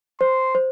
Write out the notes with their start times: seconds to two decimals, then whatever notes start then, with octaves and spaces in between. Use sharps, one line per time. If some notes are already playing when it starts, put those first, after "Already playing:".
0.20 C5 C6
0.55 C5